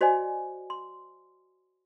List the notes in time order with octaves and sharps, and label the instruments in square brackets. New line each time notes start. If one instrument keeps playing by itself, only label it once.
[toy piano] F#4 C5 D5 D#5 G#5
C6